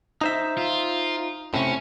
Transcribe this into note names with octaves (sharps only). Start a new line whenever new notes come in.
D#4 C5 E5
F4
A2 C3 C#4